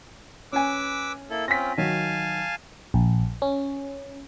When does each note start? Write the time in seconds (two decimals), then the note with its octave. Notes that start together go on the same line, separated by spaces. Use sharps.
0.53 C#4 B4 G#5 D6 E6
1.30 A#3 E4 A4
1.48 C4 C#4 F4 A#6 B6
1.77 D#3 F#3 F5 G#5 A5
2.94 A#1
3.42 C#4